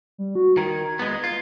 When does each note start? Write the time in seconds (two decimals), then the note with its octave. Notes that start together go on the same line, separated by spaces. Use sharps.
0.18 G3
0.35 F#4
0.57 D#3 G#6
0.99 G#3 B3
1.24 F4